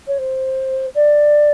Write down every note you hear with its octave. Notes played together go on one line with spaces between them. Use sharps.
C#5
C5
D5